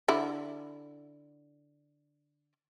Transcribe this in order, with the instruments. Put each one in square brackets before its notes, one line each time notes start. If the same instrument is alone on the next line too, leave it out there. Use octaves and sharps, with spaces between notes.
[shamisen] D3 E4